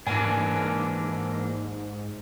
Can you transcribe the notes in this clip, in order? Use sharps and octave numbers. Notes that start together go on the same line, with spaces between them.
G#2 E3 A#3 D4 G#5